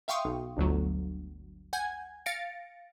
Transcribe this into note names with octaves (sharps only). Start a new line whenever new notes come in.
E5 F5 G5 C6 C#6 D#6
B1
G1 D2 F#3
F#5 G#5 G6 G#6
F5 A6 A#6 C#7 D7